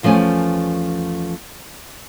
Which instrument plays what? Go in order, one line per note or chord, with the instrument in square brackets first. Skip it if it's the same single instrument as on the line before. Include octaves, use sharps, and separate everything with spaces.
[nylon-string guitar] E2 F3 A3 C#4 G#5